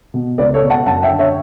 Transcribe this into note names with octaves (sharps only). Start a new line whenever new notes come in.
B2
C#2 B4 D5
A4 C#5
B2
F#5 A5
F#2 F#5 A5
E5 G5
D3
C#5 E5